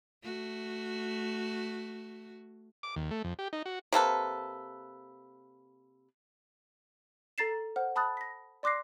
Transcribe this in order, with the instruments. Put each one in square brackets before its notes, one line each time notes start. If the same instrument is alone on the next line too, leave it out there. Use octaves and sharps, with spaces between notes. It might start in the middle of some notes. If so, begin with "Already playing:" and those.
[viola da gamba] A3 F#4
[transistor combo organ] D6
D#2
A3
F2
G4
D#4
F#4
[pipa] C3 A#3 A4 B4
[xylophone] A4 A#5 A6 C7 E7
C5 F#5 F6
A5 B5 D#6 F#6 A6
A#6 B6
D5 C6 D6 F#6 A#6 C7